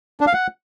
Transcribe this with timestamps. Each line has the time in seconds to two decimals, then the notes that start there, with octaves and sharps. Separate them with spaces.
0.21 D4
0.27 F5
0.33 F#5